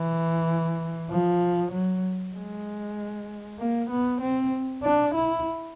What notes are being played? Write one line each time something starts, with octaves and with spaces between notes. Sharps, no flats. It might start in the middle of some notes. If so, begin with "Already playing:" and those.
Already playing: E3
F3
F#3
G#3
A#3
B3
C4
D4
E4